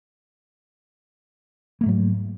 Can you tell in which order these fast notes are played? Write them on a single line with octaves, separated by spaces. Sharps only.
A#3 A3 G#2 F#3